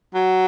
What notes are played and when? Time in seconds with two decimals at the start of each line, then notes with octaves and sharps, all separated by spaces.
0.15 F#3